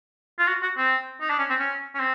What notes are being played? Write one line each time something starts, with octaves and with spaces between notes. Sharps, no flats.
F4
F#4
F#4
C4
D#4
D4
C#4
C4
C#4
C#4
C4